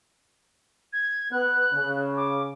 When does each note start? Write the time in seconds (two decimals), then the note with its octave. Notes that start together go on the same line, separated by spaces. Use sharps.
0.93 G#6
1.32 B3 F#6
1.73 C#3
2.17 D6